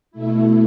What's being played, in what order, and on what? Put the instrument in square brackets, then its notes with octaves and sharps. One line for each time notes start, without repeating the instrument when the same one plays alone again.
[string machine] B2 A3 E4